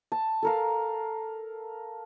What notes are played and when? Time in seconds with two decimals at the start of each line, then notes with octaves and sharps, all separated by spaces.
0.12 A5
0.43 A4 A#4 F5